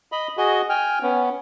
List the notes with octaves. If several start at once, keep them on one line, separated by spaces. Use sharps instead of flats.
D#5 B5
F#4 G#4 D#5
G5 G#5 F6
B3 C#4